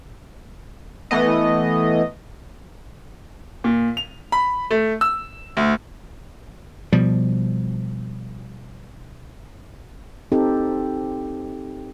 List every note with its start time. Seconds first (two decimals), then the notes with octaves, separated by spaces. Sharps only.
1.11 E3 A3 B3 D#5
3.64 A#2
3.97 F7
4.32 B5
4.71 A3
5.01 E6
5.57 D2
6.93 B2 F3 G3
10.32 C4 D#4 G4 A4